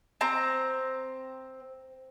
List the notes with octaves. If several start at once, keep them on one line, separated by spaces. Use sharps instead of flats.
C4 A#5